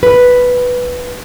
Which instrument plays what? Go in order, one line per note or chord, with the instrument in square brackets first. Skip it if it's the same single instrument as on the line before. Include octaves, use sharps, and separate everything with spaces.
[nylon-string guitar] B4